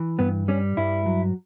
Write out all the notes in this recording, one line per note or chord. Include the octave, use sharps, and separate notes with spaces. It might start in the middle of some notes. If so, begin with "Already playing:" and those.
Already playing: E3
G2 B3
G3 C#4
G2 E4
F#3